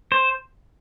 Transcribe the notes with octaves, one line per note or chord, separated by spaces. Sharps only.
C5